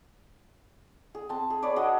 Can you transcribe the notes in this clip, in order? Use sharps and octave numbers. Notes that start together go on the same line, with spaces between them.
G#4
C4 A5
G#4
G#4 B4 C#5 D5
D4 F#4 G#4 D#5